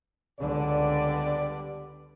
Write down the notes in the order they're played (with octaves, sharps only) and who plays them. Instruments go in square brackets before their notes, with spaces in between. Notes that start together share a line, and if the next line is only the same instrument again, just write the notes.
[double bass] C#2 D3 [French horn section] G3 B3 D5